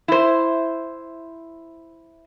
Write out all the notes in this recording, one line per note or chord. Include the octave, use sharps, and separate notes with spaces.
E4 C5